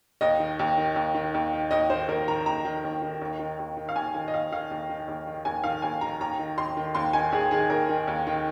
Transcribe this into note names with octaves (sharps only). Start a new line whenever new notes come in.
D#2 D#5
D#3
D#2
D#3
D#2
D#3
D#2
D#3
D#2 D#5
D#3 C5
D#2 A#4
D#3 A#5
D#2 A#5
D#3
D#2
D#3
D#2
D#3
D#2
D#3
F5
D#2 G#5
D#3 G#5
D#5
D#2 F5
D#3 F5
D#2
D#3
D#2
D#3
D#2 G#5
D#3 F5
D#2 G#5
D#3 A#5
D#2 A#5
D#3
D#2 C6
D#3
D#2 C6
D#3 G#5
D#2 G#4
D#3 G#4
D#2 A#4
D#3
D#2
D#3